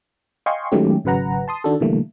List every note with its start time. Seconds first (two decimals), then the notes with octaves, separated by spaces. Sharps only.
0.46 D#5 F5 G5 G#5 C6 C#6
0.72 D#3 F#3 G#3 A3 C#4 G4
1.04 G#1 C#3 F#3 B4 F#5 A#5
1.48 A5 C6 D#6
1.64 D#3 D4 F#4 A4
1.80 B2 D3 E3 G3 A3 A#3